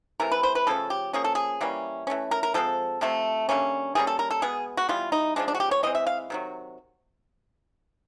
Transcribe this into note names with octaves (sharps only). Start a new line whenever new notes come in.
C3 E3 A3 A#4
B4
C5
B4
C#3 F3 A3 C#4 A4
G4
F3 A#3 C#4 G#4
A4
G#4
E3 G3 A#3 C#4
E3 A3 C#4
A#4
A#4
F3 G#3 C4 A4
C3 F3 A3 C4
D3 G3 A#3 C#4
E3 G3 A#3 C#4 G#4
A4
A#4
A4
B2 G#3 B3 G#4
F#4
E3 G3 B3 F4
D#4
C#3 F3 G#3 D4
D4
F#4
G4
C#5
E3 G#3 C4 D#5
E5
F5
C3 D#3 F#3